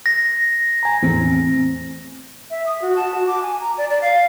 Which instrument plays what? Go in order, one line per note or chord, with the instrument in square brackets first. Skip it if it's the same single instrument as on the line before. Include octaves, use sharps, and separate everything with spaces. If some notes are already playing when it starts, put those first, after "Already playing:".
[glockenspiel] A#6
[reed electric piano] G#5 A#5
E2 A2 C4
[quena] E5
D#6
F#4
A5
F#4
D6
G#5
A#5
D5
D5
F5